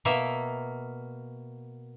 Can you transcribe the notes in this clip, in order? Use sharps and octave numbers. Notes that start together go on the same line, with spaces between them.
B2 A#3 A#4 E5